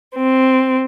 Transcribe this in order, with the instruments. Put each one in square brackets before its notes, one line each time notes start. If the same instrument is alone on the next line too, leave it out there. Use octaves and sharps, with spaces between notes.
[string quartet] C4